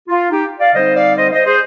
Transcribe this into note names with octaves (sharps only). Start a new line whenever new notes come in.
F4
D#4 G4
D5 F5
D3 G3 C4 D#4 C5 D#5
D5 F5
C5 D#5
C5 D#5
G#4 C5